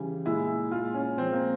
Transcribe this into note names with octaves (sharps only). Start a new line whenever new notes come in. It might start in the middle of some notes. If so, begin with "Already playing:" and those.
Already playing: C#3 E3 G3
A#2 G#3 E4
A#2 G#3 F4
C#4
A#2 F3 G#3 C4
A#3